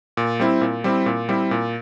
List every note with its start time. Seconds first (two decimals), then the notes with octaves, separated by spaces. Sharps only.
0.17 A#2
0.40 G3 C4 E4
0.61 A#2
0.84 G3 C4 E4
1.06 A#2
1.29 G3 C4 E4
1.51 A#2